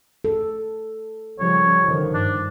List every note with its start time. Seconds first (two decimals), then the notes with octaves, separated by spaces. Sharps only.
0.24 A4
1.39 C#3 F3 G3 C#5
1.84 D3 D#3 F3
2.14 G2 D4